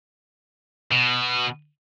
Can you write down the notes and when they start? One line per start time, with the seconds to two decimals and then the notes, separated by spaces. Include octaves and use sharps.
0.92 B2